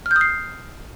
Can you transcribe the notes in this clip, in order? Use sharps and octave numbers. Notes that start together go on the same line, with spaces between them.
F6
G6
D#6
C7